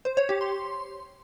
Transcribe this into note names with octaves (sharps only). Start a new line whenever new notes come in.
C5
C#5
G4
C6